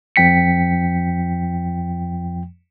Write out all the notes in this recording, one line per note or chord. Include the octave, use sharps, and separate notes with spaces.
F2 F3 G5 B6 C#7